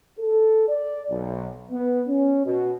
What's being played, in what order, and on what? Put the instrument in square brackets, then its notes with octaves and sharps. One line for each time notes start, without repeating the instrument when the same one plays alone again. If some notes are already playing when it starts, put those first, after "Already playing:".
[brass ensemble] A4
D5
B1
B3
C#4
B2